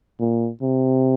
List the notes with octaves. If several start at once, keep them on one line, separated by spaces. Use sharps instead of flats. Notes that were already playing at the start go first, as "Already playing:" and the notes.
A#2
C3